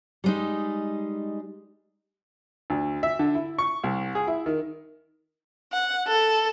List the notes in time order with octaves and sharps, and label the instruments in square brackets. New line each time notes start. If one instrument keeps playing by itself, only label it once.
[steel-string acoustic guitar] G3 G#3 D#4
[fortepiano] D2
E5
D3
E4
C#6
C2
G#4
E4
D#3
[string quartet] F#5
A4